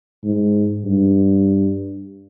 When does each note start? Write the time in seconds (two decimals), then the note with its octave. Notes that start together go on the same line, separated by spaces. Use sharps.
0.24 G#2
0.85 G2